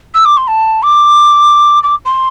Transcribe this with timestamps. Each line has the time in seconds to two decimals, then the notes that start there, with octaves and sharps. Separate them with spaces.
0.14 E6
0.25 D6
0.37 C6
0.47 A5
0.82 D6
1.83 D6
2.05 C6